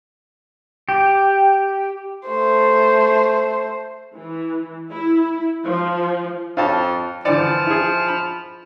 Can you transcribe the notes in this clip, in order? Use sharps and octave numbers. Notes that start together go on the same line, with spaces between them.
G4
A3 C5
E3
E4
F3
F2 F4 C#5 A5
D3 E3 F3 D5
E4 G#4
B5